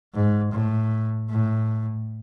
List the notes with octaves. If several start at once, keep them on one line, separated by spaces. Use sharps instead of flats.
G#2
A2
A2